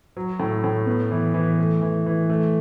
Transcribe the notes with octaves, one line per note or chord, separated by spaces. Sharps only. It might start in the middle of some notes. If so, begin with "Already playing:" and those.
F#3
A2
A2
B3
E3
E3
A3
E3
E3
A3